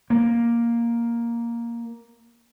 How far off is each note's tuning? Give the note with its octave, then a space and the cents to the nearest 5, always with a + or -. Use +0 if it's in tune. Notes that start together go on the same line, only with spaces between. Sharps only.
A#3 +5